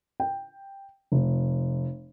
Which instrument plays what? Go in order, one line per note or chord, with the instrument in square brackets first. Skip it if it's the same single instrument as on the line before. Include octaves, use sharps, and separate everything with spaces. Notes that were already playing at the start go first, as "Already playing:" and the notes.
[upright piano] G5
F1